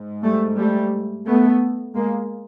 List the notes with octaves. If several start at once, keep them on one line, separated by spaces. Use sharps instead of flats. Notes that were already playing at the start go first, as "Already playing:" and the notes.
Already playing: G#2
G3 A3
G3 A3
A3 B3
G#3 A#3